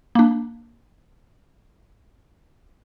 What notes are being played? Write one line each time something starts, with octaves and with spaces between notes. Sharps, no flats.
A#3 D4